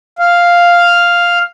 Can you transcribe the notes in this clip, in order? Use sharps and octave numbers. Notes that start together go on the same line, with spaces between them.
F5